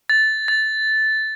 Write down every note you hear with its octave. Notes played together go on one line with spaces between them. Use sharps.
A6
A6